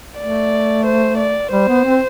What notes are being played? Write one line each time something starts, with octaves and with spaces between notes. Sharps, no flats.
A3 D5
C5
D5
G3 C5
B3
C4